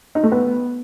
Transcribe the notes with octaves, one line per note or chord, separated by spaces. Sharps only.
D#4
A3
B3